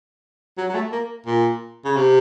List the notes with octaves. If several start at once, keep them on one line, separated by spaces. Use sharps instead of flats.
F#3
F#3
A3
A#3
A#2
C#3
C3